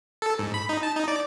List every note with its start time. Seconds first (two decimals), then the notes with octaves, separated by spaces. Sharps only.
0.22 A4
0.39 G#2
0.54 B5
0.69 D#4
0.83 A5
0.96 D#4
1.08 D5